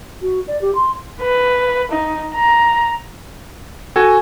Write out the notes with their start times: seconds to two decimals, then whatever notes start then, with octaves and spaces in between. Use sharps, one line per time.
0.22 F#4
0.48 D5
0.62 G4
0.75 C6
1.21 B4
1.92 D#4
2.35 A#5
3.96 F#4 A4 G#5